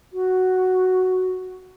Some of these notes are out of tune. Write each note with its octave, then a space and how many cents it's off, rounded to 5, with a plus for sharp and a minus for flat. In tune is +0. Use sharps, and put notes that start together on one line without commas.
F#4 +5